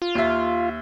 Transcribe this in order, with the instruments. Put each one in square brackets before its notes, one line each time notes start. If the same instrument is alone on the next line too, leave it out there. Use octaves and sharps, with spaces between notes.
[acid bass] F4
[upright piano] D#2 E5